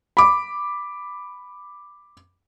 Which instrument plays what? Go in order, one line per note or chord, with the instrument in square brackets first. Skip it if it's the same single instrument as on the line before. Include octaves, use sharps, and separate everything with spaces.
[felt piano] B5 D6